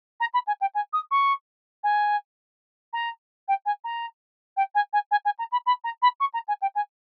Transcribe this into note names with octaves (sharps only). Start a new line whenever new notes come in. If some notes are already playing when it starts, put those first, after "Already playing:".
A#5
B5
G#5
G5
G#5
D#6
C#6
G#5
A#5
G5
G#5
A#5
G5
G#5
G#5
G#5
G#5
A#5
B5
B5
A#5
B5
C#6
A#5
G#5
G5
G#5